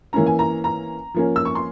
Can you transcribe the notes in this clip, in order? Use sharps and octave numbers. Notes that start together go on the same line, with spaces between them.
E3 A#3 C#4 A#5
G#5
A#5
A#5
F3 A#3 C#4
E6
C#6
C6